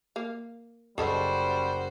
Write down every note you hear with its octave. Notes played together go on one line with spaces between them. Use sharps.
A#3 F5
F#1 C#3 G3 F#4 A4 C5 D#5